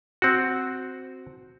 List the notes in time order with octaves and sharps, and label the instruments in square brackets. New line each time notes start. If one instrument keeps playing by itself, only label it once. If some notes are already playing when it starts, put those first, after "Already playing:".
[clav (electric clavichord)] C4 F#4